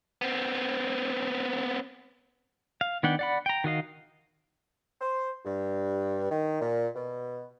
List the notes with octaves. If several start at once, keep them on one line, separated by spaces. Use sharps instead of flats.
B3 C4
F5
D#3 B3 D4 F#5 G5
D5 F#5 B5
G5 A#5
D#3 F#4 D#5 F5
C5
G2
D#3
A#2
B2